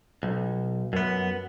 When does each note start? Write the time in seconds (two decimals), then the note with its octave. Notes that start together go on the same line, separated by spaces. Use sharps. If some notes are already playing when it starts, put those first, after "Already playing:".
0.23 B1
0.93 F#2 B3